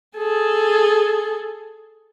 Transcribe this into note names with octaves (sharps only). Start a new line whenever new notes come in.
G#4 A4